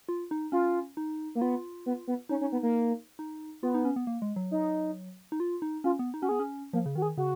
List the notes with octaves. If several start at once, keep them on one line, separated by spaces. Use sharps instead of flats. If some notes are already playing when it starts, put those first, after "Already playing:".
F4
D#4
C#4 F4
D#4
A#3
B3 F4
B3
B3
C#4 D#4
C#4
B3
A#3
D#4
B3 F4
D#4
C#4
B3
A#3
G#3
F#3
D#4
D#4
F4
D#4
C#4 F4
B3
D#4
C#4 F#4
B3 G#4
C#4
F3 A#3
C#3
D#3 F#4
G#4
C#3 F#4